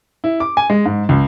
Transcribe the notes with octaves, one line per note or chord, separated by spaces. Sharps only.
E4
D6
G#5
G#3
G#2
C#2